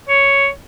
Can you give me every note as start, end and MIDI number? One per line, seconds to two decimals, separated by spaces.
0.09 0.48 73